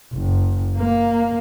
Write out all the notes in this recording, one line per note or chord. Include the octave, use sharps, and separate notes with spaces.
F#1
A#3